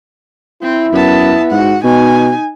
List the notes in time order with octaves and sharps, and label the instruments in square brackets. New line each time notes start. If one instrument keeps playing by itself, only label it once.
[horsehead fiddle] C4 [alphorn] E4
[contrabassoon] F#2 [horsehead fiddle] B3 A5
[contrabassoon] G#2 [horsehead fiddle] F#4 F#5
[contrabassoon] B2 [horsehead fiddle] D#4 G#5